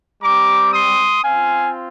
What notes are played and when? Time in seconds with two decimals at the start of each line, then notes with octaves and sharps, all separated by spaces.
0.22 G3 C4 G4 A#5 D6
0.73 C6 D#6
1.24 C4 F4 F5 G#5